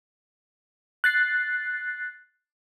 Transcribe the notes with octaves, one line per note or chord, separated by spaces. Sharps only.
F#6 A6 C7